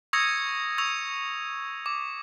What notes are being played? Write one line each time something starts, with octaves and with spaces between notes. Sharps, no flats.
C#6 D#6 E6 G#6 A#6 C#7
C#6 E6 G#6 F7
D6